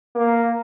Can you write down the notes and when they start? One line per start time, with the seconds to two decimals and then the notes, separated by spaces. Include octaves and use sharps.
0.15 A#3